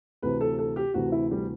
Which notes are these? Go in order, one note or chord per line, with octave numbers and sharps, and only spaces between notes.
D2 C3 E3 B4
A4
A4
G4
D2 C3 E3 F#4
E4
G3